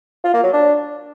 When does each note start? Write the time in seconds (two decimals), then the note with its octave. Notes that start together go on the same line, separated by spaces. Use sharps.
0.24 F4
0.34 A#3
0.44 F#3
0.53 D4